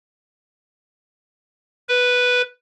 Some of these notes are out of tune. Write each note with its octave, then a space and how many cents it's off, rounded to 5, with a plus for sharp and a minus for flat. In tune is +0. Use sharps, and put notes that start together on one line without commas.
B4 +0